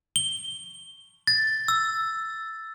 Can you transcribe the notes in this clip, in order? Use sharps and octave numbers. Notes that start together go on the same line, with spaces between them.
G7
A6
E6